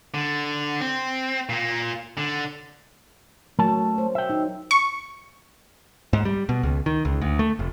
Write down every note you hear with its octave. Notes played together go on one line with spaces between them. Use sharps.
D3
C4
A#2 A#3
D3
F#3 A3 A#4 A5
C5
E5 G5
D#4
C#6
G#2
G3
B2
C#2
D#3
C#2
D2
A3
F1